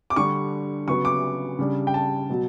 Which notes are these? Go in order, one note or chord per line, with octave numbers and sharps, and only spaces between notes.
D6
D3 G3 D4 C#6
C#3 F#3 B3 C#6
D6
C#3 G3 D4
G5
A5
B2 F#3